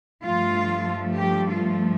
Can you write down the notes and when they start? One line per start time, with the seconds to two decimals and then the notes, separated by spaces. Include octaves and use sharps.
0.24 G2 F3 A3 F4
1.19 G4
1.50 F4